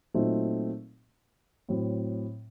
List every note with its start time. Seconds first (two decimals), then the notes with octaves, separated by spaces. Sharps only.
0.14 A#2 F#3 A3 C4 D#4
1.69 A2 F#3 C4